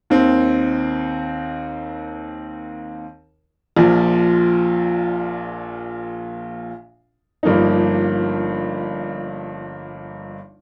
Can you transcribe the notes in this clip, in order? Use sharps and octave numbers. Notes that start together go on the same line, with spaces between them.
D#2 D#3 C4
A#1 A#2 F3
G1 G2 F3 A#3 D#4